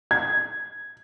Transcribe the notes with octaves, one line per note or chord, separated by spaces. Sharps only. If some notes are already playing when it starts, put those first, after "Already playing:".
G#6